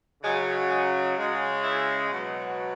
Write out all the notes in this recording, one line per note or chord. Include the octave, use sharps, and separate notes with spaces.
C#3 F#3 G#3
G#3
C#3 G#3
E4
B2 F#3